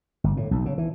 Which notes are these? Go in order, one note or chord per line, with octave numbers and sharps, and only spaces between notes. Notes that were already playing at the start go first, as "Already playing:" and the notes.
G1
A2
B1
C#3
E3